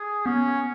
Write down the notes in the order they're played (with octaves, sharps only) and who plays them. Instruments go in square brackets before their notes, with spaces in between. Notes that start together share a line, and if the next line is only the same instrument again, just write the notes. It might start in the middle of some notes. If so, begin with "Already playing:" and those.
Already playing: [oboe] G#4
[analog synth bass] B3 [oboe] C#4